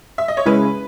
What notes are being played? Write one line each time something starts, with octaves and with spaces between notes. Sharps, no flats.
E5
D#5
C#5
C#3 G#3 C#4 E4 B4